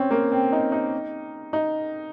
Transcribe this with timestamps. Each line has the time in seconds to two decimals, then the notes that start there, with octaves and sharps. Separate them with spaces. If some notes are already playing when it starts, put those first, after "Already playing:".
Already playing: C4 C#4
0.11 A#3
0.32 C4
0.52 D#4
0.72 D#4
1.53 D#4